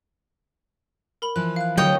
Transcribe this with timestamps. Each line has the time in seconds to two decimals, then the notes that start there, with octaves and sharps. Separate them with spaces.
1.22 A#4 B5 F#7
1.36 E3 F3 F#6
1.56 F5 F#6
1.77 D3 F#3 C#5 D#5 G5